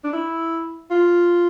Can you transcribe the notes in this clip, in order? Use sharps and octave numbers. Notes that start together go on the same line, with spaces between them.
D4
E4
F4